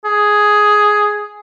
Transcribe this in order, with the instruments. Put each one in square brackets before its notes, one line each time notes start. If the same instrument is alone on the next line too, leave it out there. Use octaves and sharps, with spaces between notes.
[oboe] G#4